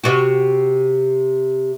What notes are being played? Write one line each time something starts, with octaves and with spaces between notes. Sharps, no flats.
C3 F#4